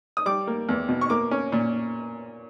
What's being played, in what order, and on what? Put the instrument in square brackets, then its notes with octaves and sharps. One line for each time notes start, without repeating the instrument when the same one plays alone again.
[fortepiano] D#6
G3 D6
A#3
E2
B2
C#6
A#3 D6
C#4
A#2